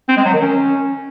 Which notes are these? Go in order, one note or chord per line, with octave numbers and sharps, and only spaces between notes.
C4
G#3
F#3
D#3
C#4